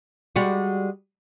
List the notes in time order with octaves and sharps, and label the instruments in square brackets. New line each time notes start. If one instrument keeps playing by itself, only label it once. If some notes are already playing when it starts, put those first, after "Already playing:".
[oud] G3 G#3 F#4